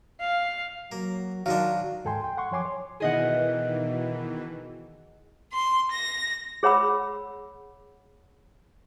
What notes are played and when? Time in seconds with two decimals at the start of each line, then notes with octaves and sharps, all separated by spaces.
0.21 F5
0.92 F#3 A#3
1.46 D#3 F#3 G#3 D4 F5
2.05 D#2 G#2 A4 G5 G#5 C6
2.24 G5
2.37 F#5 C6 C#6
2.51 F#2 F3 C#5 G#5 C6 D6
2.65 C#5
3.00 B2 D#3 E3 G#4 D#5 F#5
5.53 C6
5.92 A#6
6.63 G#4 C#5 F#5 B5 E6